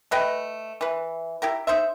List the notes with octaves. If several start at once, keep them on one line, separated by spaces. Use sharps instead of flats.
A3 B4 D#5 G5
E3 B4
E4 G4 A#4
D#4 C5 E5